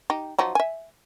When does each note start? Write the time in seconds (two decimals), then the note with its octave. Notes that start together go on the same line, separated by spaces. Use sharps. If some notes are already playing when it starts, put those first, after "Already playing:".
0.10 D#4 G4
0.38 F3 F#3 D#4
0.55 E5 G#5